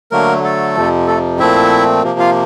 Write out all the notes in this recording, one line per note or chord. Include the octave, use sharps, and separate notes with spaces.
D3 F#3 A3 A#3 A#4
A3 A4
F2 C3 F3
A3 A4
A#2 F3 A3 C4 E4 E5
C3 F3 A#3
F4 F5